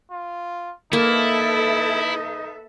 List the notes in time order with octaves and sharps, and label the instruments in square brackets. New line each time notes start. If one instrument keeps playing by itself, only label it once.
[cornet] F4
[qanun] A#3 [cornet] D#4 [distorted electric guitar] E4 [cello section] A4 B4 E5